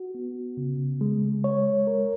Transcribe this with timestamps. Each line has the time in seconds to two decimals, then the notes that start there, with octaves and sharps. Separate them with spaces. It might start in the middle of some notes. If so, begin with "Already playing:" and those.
Already playing: F#4
0.15 B3
0.57 C#3
1.01 G#3
1.44 C#5
1.87 A#4